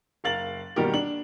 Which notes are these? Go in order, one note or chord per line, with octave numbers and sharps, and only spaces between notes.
F#1 A#4 F5 A6 F#7
B2 D#3 G3 A#3 G4 A#4
D4 F#7